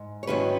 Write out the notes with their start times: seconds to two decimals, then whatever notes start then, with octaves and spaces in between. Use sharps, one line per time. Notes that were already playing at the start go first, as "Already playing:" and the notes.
Already playing: G#2
0.23 C#5
0.27 G#2 D#3 F#3 C#4 E4 B4